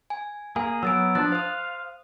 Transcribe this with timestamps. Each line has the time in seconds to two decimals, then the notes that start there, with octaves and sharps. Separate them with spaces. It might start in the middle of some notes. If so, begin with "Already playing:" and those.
0.10 G#5
0.56 A#3 G#4 G#5
0.83 F#3 B3 E6 A6 D7
1.15 F3 D4 F#6 A6
1.32 C5 F5 D#6